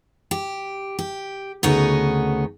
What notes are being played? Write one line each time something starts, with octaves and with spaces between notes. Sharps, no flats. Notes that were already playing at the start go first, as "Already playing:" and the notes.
G4
G4
D2 C#3 B3 D#4 C#5 D#5